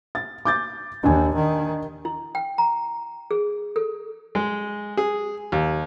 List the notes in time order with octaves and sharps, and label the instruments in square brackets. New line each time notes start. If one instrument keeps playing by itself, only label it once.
[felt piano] A6
D6 G6 A6
[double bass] D#2 [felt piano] D4 G#5
[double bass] D#3
[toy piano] E4
G5
A#5
G#4
A4
[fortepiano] G#3
G#4
D#2